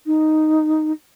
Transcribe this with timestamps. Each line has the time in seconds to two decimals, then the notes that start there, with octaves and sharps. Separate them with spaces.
0.06 D#4